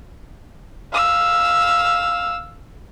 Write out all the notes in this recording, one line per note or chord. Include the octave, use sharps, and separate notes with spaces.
F5 E6